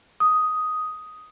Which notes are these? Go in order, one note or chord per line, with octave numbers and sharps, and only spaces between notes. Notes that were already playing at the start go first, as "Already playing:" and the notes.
D#6